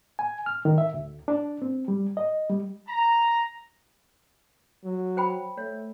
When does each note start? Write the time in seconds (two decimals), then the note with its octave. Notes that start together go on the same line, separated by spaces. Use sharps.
0.19 G#5
0.46 F6
0.65 D#3
0.78 E5
0.94 D2
1.28 D4
1.62 C4
1.88 G3
2.17 D#5
2.50 G3
2.88 A#5
4.84 F#3
5.17 C5 G5 B5
5.58 A3 C#5